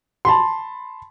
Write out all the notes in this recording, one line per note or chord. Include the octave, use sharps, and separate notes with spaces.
A5 B5 C6